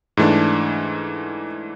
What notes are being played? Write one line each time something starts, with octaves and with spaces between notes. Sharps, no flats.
G#2 E3 A3 D4